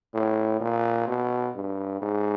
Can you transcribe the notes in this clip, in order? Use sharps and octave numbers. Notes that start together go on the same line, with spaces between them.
A2
A#2
B2
G2
G#2